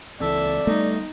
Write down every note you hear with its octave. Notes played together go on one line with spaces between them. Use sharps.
C#2 E3 C4 A4 D5 E5
G3 A3 B3 D#4